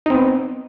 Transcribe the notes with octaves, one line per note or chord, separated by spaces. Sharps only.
B3 C4 D#4